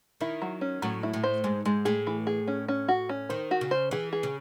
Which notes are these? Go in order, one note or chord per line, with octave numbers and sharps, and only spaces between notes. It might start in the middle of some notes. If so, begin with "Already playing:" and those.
D#3 E4
F#3
C#4
A2 F#3
E4
A2
C5
G#2 G#3
G#2 G#3
A2 G#4
E3
G#4
C#4
C#4
F#4
C#4
D#3 C5
F#4
C#3
C5
E3 G#4
G#4
C#3